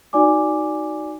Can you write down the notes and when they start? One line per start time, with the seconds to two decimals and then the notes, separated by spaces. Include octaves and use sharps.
0.13 D#4 F#4 D5 G#5 D6